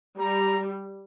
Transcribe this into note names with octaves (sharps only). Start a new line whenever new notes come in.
G3 A#5